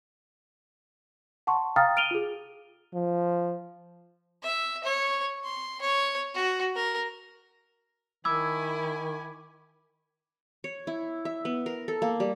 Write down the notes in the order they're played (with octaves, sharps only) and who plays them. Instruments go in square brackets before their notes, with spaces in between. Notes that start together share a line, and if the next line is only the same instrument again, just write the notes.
[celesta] F#5 A5 C6 C#6
F5 G5 A#5 D#6 F6 A6
F6 D7 D#7 F7 G7
F4 G#4
[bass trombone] F3
[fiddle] E5
C#5
C6
C#5
F#4
A#4
[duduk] D#3 [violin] E4 G#5 [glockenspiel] B5 D6 G#6 [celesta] E6
[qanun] C#5
E4
E5
B3
A#4
A4
A#3
G3